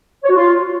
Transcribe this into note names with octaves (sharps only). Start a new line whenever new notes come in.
C#5
F#4
F4